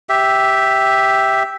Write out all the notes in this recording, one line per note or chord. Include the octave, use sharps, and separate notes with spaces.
G4 E5